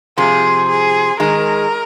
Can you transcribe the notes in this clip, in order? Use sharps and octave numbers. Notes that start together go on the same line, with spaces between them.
C3 F3 G#4
G#4
D#3 G#3 A#4